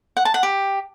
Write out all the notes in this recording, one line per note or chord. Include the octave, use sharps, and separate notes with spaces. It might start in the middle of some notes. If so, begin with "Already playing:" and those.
F#5
A5
F#5
G4